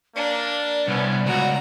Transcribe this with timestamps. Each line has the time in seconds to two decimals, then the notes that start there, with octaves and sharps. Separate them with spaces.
0.16 A#3 D4 D5
0.88 C2 B3 C#4
1.27 C#2 F#4 A#5